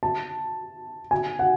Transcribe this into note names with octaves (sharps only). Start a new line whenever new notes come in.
A5
G#5
F#5